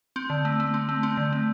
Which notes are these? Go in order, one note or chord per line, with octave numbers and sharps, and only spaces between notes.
C4
D3
A3
A3
C4
A3
C4
D3
A3